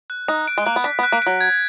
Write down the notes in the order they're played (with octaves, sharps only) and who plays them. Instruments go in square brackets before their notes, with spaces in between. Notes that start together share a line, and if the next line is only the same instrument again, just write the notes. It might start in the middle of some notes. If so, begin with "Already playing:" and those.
[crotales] F#6
[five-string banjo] D#4 [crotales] F#6
[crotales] D7
[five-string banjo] G#3
[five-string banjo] A#3 [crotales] F#6
[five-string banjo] B3
[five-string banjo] D4 [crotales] B6
[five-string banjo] B3
[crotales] F#6
[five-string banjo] A#3
[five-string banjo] F#3 [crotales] D7
[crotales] G#6